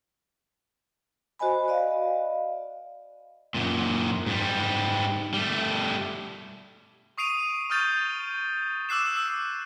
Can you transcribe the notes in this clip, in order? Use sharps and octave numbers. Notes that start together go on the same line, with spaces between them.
F#4 C5 D#5 G#5 B5
D5 D#5 F5
F#2 A#2
G#2 G3
G3 A3
C#6 D#6 C7 D7 D#7 F7
C#6 D#6 F6 G6 A6
D6 E6 F#6 C7 E7
E6 C7